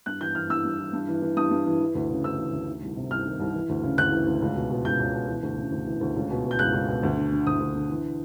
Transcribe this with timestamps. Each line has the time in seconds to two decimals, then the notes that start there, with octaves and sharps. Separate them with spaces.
0.06 G2 F#6
0.21 E3 G6
0.35 E3 F6
0.50 G2 E6
0.65 G2
0.79 E3
0.93 G2
1.08 E3
1.22 E3
1.37 G2 D#6
1.51 G2
1.66 E3
1.80 E3
1.95 D2
2.10 C#3
2.24 D2 E6
2.38 E3
2.53 D2
2.67 D#3
2.82 C2
2.96 C3
3.11 C2 F6
3.26 D#3
3.40 C2
3.54 E3
3.69 D2
3.83 C#3
3.98 D2 F#6
4.12 E3
4.26 D2
4.42 C#2
4.55 B2
4.70 B2
4.85 C#2 G6
5.00 C#2
5.14 B2
5.28 E3
5.43 D2
5.57 C#3
5.72 D2
5.87 E3
6.01 D2
6.16 C#2
6.31 B2
6.45 B2
6.51 G6
6.59 C#2 F#6
6.74 C#2
6.88 B2
7.03 D2
7.17 D3
7.32 D3
7.47 D2 D#6
7.60 D2
7.75 D3
7.89 E3